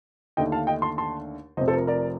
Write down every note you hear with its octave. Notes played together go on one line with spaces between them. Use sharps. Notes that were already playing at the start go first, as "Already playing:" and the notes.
D#2 D3 A3 D4 D#5 G5
F5 A5
D#5 G5
A5 C6
A5 C6
F1 F2 C3 C5 D#5
A4 C5
A#4
A#4 D5